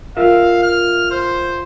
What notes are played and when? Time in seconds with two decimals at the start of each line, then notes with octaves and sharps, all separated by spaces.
0.17 F4 A#4 E5 F5
0.63 F6
1.11 C5